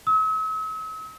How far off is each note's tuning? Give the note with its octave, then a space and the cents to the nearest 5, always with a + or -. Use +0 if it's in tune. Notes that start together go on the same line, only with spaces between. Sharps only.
E6 -45